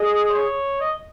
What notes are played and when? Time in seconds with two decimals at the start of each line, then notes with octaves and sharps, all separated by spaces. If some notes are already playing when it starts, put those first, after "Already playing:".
Already playing: G#4 D#5
0.30 C5
0.35 C#5
0.80 D#5